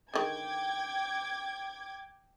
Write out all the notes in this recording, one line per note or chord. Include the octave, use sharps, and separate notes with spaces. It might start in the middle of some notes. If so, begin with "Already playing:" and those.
D3 D#3 G#3 G5 D6 G#6